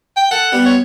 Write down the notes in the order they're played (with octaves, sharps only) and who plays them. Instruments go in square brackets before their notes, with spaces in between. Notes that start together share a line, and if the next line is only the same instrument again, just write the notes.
[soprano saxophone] G5
[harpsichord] A4 [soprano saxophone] F#5
[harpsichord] G3 B3
[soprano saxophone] C#5